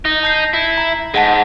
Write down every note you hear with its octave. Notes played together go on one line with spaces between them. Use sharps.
D#4
A5 G6 C7
E4
A#5
G#2 G#4 F#5 A5